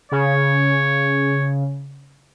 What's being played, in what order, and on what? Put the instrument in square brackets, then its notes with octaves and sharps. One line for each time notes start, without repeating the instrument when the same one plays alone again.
[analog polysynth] C#3 [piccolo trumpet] C#5